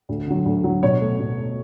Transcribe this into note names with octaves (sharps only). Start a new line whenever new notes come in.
D2
D3 F#3
D2
D3 F#3
B2 C#5
A3
B2
A3